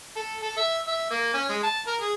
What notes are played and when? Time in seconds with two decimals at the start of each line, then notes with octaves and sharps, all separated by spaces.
0.16 A4
0.42 A4
0.57 E5
0.87 E5
1.11 A#3
1.33 C#4
1.49 G#3
1.63 A5
1.87 A#4
2.01 G#4